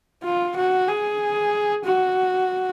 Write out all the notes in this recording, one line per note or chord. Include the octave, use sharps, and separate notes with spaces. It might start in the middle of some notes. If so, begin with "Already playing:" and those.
F4
F#4
G#4
F#4